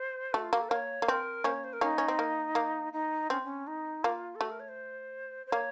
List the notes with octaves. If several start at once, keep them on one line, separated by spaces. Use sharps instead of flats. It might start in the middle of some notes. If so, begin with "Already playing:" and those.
Already playing: C5
A3 F#4
F4
A#3 F#4
A4
A#3 C#5
A#3
C4 A#4
A#3 C#4 C5
C#5
C5
A#4
A#3 C#4 D#4
C#4
C4
A#3
A#3
D#4
C4 C#4
C#4
D#4
A#3 F4
A4
A3 F#4
A#4
C#5
C5
C5
A#3 C#5